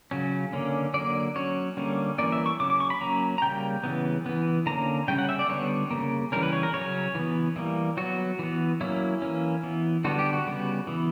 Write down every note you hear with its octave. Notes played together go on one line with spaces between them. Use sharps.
C#3 F#3 C#4
D3 A#3 C#4
D3 F#3 A#3 D5
F#3 C#4 C#5
D3 G3 A#3 C#4
E3 A#3 C#4 D5
E5
C#6
C#3 F#3 C#4 D6
D6
C#6
B5
F#3 A#3 C#4 A#5
A#5
C#3 G3 A#3 G5
C#3 E3 B3
E3 B3
D3 A#3 C#4 A#5
C#3 G3 C#4 G5
F#5
E5
D5
D3 G3 B3 C#5
C#3 F#3 A#3
C#3 E3 G3 C#4 A#4
B4
C#5
A#4
C#3 F#3 C#4 C#5
E3 B3
E3 G3 A#3
F#3 B3 F#4
E3 B3
F#3 A#3 C#4 E4
E3 A#3 C#4
E3 B3
D3 G3 B3 F#4
G4
F#4
C#3 G3 B3
E3 B3